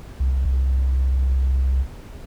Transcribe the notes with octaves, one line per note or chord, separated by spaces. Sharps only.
C2
C2